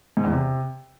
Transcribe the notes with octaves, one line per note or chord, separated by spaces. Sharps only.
G#2
E2
C3